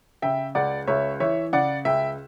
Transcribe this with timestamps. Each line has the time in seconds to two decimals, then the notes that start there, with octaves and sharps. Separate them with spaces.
0.22 C#3 E5 G5
0.55 C#2 D5 F#5
0.87 C#2 C#5 E5
1.20 E3 C#5 E5
1.53 C#3 D5 F#5
1.85 C#2 E5 G5